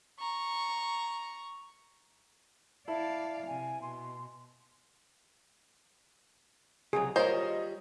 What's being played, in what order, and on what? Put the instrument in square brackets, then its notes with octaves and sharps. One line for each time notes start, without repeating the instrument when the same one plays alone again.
[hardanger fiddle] A#5 C#6
[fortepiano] E4 [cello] D5 F5 [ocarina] A5
[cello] C3 [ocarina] G#5
[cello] B2 [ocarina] C6
[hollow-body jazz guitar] C#2 C3 F#3 [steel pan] G#4
[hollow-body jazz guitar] G3 F4 A#4 [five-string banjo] C5 [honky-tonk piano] C#5 D#5